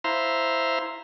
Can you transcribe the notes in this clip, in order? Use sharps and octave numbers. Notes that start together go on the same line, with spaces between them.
E4 C5 E5 F5 A#5 C6